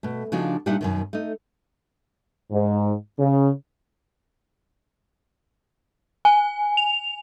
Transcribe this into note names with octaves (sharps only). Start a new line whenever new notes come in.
B2 A3
C#3 F3 D4 D#4 F#4
A#2 G3 D4 D#4 E5 F#5
F#2 B2 D#3
A3 D#4
G#2
C#3
G#5
F7